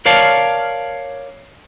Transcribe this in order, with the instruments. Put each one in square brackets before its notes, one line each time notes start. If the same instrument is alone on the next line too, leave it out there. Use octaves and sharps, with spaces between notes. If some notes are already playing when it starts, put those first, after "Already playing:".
[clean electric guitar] A#4 C#5 D5 F5 A5